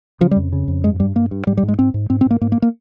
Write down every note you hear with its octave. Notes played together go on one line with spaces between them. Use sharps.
C#3 F3
G3
F2
C#3
F2
G2 G#3
G2 G3
G2 A#3
G2
G#2 G3
G3
G#2
G#3
G#2 C4
G#2
G#2 C4
C4
G#2 A#3
G#2 A#3
A#3
A#3